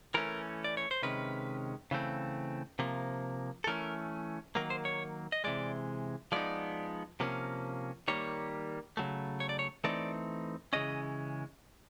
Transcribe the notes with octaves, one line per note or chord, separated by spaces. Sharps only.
E3 A3 C#4 A#4
D5
C#5
C5
C3 D#3 G#3 C#4 B4
C#3 E3 A3 C4
C3 F3 A#3
A4
E3 A3 C#4 A#4
D#3 F#3 A#3 A#4
C5
C#5
D#5
C3 E3 G#3 D5
F3 G#3 B3 D#4 D5
C3 F3 A#3 C#4
D#3 G3 A#3 C#5
C#3 F#3 A3
C#5
D5
C#5
E3 A3 C4 D#4 D5
C#3 E3 G#3 C#4 D#5